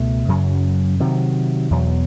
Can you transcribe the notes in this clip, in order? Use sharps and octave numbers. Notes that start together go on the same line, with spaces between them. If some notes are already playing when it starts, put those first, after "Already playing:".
Already playing: C#2 B2 A3
F#2 C#3 F#3
C3 D#3 F#3
E2 B2 F#3